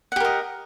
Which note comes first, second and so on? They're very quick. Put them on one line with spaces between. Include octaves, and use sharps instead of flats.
F#5 G4 A#4 D#5